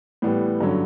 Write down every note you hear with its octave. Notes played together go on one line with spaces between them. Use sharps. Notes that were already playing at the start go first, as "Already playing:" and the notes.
A2 E3 G3 B3
G2 D3 F#3 C#4